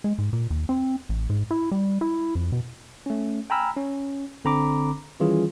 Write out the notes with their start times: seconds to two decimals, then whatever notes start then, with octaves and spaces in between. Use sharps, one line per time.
0.04 G#3
0.18 G#2
0.33 A#2
0.50 D#2
0.69 C4
1.09 A1
1.30 G#2
1.51 E4
1.71 G3
2.01 E4
2.35 F2
2.52 B2
3.06 A3 C#4
3.50 G5 G#5 A#5 B5 E6 F6
3.77 C#4
4.44 G1 D3 C4 A#5 B5 D6
5.20 D#3 E3 G3 C#4 F4 G#4